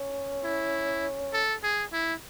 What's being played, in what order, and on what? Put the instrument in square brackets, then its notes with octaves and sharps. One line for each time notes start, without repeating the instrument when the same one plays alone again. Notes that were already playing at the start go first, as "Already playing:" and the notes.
Already playing: [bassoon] C#4
[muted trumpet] E4
A4
G#4
E4